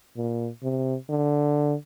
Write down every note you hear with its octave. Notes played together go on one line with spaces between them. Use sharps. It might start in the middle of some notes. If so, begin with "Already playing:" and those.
A#2
C3
D3